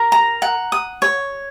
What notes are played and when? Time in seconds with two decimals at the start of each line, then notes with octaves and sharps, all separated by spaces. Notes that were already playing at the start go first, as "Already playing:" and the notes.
Already playing: A#4
0.12 A#5
0.42 F#5
0.72 D#6
1.02 C#5